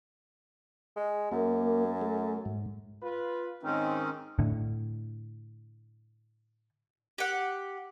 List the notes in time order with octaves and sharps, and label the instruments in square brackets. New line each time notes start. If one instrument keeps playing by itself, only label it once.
[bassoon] G#3
[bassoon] F#2 [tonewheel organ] A#3
[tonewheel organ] A3
G#2
[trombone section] F4 B4
[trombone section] G#2 D#3 [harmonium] C4 C#4 D#4
[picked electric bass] A2 D3
[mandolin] G4 F#5